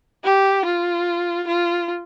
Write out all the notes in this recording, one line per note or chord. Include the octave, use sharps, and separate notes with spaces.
G4
F4
F4